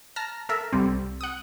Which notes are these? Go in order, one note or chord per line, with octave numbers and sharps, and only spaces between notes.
A5 A#5 F6
A4 A#4 E5
C2 G3 C4
F#5 D#6